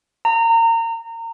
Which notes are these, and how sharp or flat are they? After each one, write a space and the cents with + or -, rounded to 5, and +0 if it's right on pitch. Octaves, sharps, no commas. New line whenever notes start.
A#5 -30